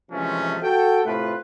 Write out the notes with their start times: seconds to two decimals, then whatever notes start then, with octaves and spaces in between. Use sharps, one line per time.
0.11 C3 E3 F3 G#3 A3 C#4
0.63 F#4 A4 G5
1.05 A2 C3 A3 F4 B4